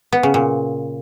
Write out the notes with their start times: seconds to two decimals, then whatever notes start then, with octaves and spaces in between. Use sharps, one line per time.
0.12 B3
0.23 C#3
0.34 A#2